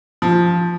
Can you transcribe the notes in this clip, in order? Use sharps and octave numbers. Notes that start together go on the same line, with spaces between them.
F3